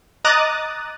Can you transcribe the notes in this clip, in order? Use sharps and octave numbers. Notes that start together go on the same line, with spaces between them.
D#5 A#5 D6 D#6 F#6 A6